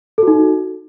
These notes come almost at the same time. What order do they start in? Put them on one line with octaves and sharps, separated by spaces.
A4 F#4 D#4